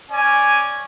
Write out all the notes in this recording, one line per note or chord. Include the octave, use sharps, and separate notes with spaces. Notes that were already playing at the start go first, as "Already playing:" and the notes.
C#4 D5 G#5